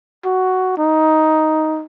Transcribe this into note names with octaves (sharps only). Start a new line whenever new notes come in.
F#4
D#4